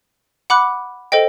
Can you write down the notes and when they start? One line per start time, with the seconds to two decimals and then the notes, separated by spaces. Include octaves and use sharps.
0.50 F#5 B5 D6 F#6
1.12 A4 C5 D#5 G5